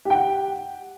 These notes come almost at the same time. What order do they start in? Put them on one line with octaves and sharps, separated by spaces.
G4 G5 F#5